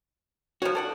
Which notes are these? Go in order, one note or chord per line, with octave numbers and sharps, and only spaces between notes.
F3 B3 F#4 C#5
A4 D5 F#5